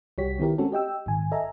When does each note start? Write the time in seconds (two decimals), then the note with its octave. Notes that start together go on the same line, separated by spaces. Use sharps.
0.18 C2 G3 F#4 G4 C#5 B6
0.39 D#3 B3 E4 G4 A#4
0.58 G#3 A3 C4 C#4 F#4 A4
0.72 G4 D#5 G5 E6
1.06 A#1 G#2 D#3 G#5
1.32 A4 D#5 E5 G#5 A#5